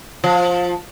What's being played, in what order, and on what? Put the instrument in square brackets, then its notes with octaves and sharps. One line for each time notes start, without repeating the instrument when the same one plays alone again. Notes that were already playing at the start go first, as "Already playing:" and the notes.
[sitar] F3